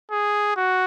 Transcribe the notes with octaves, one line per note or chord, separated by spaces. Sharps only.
G#4
F#4